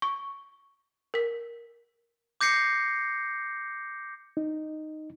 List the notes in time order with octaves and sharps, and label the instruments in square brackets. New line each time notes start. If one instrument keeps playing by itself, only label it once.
[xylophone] C#6
A#4 B6
[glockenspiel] D6 G6 A#6 C7 C#7
[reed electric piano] D#4